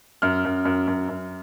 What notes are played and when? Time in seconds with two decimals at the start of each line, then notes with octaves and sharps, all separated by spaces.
0.22 F#2 F6
0.45 F#2
0.65 F#2
0.88 F#2
1.09 F#2